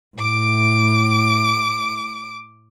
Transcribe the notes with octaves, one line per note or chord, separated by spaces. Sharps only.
A2 D6 D7